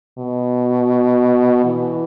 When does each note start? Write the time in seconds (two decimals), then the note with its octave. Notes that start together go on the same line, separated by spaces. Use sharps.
0.18 B2
1.65 E3